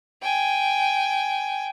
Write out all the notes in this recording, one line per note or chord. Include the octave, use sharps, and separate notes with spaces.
G5 G#5